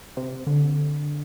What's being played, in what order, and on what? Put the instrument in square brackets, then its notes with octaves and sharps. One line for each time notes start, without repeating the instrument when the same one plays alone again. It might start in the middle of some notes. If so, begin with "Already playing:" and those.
[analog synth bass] C3
D3